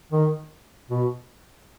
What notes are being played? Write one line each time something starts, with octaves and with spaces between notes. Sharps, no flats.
D#3
B2